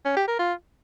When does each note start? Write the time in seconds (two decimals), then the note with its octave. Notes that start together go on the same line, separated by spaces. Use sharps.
0.05 C#4
0.16 G4
0.28 A#4
0.39 F4